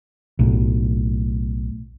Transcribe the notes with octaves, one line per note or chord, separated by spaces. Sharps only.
B1 A2